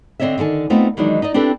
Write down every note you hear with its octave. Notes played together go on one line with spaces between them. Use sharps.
D3 C4 D4 C#5 D#5 E5
D3 D#3 A4 G#5
A3 B3 C4 D#4 F4
D#3 E3 F#3 G#3 D4 D#4
D#4 D5 D#5
C4 D4 E4 G4 A4 B4